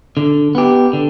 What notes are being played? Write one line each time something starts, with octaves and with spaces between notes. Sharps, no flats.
D3
B3 G4
D3